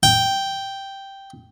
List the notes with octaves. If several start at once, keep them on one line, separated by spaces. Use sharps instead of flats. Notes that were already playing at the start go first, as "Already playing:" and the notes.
G5